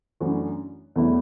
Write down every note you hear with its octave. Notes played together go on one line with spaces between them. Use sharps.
F#2 E3 A3 D4 F#4
E2 B2 F#3 A3 E4